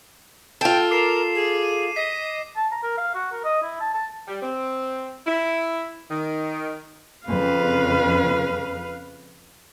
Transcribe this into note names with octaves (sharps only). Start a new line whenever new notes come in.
F4 A4 G5
A#4 D6 C7 E7
G#4
D#7
D#5 B6
A5
A#5
A#4
F5
F#4
A#4
D#5
E4
A5
A5
G3
C4
E4
D#3
F2 C#3 B4 F5